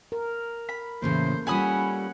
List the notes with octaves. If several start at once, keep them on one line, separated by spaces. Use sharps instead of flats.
A#4
B5
A2 C#3 E3 A3 A#3 C5
G3 C#4 F4 A4 F#5 G#5 B5 D#6